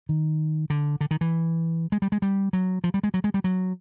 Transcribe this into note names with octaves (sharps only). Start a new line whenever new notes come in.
D#3
D3
D3
D#3
E3
G#3
G3
G#3
G3
F#3
F3
G3
G#3
F#3
G#3
G3
F#3